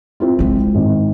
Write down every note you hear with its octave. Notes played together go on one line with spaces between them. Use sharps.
C4 E4 F4
D3 G#3
G#1